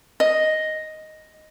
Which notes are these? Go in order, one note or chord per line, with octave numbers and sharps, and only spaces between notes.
D#5